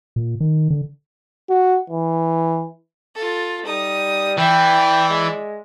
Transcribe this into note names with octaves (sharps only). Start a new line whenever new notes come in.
A#2
D#3
D3
F#4
E3
F4 A4
G3 D#4 D#6
E3 D5 E5 G5
G#3